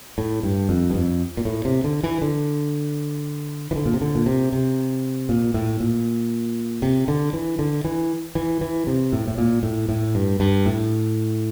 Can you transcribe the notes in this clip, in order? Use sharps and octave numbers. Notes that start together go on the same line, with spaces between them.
A2
G2
F2
G2
F2
A#2
A2
C3
D3
E3
D3
E3
D3
A#2
C3
D3
A#2
C3
C3
A#2
A2
A#2
C3
D3
E3
D3
E3
E3
E3
C3
A2
A2
A#2
A2
A2
G2
G2
A2